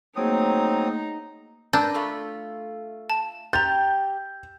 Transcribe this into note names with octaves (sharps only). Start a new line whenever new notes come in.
F#3 A3 A#3 C4 D#4 G#4 D#6
D4 B4 A#5 E6 G6 A6
A3 F4 B5
A5
G4 A#5 G6 A6